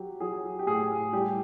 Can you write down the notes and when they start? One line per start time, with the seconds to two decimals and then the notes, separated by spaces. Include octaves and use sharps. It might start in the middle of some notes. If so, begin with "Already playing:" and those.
Already playing: F#3 G4
0.20 F#3 G#4
0.59 G4
0.66 A2 G#4
1.13 G3 G4